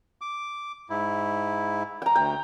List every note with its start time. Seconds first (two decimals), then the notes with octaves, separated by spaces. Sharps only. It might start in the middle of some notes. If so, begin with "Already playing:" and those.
0.21 D6
0.90 G#2 E4
2.02 G5 A#5
2.15 D2 G5